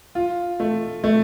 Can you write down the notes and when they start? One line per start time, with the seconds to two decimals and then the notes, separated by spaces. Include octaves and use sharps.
0.15 F4
0.60 A3
1.04 A3